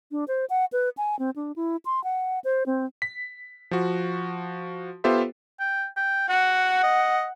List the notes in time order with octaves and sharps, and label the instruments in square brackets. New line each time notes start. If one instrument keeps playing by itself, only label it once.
[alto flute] D4
C5
F#5
B4
G#5
C4
D4
E4
C6
F#5
C5
C4
[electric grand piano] B6
F3 F#4
B3 F4 G4 A4 C5 E5
[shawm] G5
G5
[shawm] F#4 [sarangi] F#5
[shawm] D#5